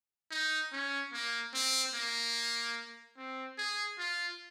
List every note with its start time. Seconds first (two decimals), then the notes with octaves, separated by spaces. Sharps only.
0.31 D#4
0.72 C#4
1.13 A#3
1.54 C4
1.94 A#3
3.17 C4
3.58 G#4
3.99 F4